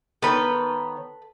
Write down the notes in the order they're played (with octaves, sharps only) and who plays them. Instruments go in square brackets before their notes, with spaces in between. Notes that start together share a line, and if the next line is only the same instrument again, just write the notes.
[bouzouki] D#3 B3 C#5 [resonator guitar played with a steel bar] A4 B4